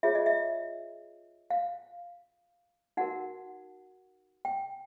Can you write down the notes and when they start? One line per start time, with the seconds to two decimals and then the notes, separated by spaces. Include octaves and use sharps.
0.03 F4 G#4 C#5 E5
0.15 D#5
0.26 E5
1.50 F5
2.97 D#4 F#4 A#4 F#5
4.45 G5